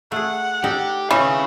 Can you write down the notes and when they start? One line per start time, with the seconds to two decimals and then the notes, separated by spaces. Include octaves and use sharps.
0.12 A3 G#4 F#5
0.64 D#4 G4 A4 D5
1.11 E3 C#4 D#4 G#4 F5 C#6